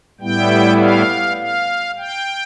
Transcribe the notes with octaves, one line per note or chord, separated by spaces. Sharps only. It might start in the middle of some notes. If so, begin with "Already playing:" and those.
A2 G3 B3 E4 G5
F5
F5
G5